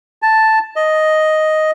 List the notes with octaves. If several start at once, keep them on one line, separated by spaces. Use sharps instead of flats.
A5
D#5